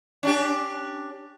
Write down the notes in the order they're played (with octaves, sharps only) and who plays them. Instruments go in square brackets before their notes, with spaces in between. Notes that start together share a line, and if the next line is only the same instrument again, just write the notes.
[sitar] C#4 D4 G4